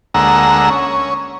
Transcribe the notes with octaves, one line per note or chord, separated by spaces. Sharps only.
D2 G#3 A#3 F#5 A#5 E6
C#4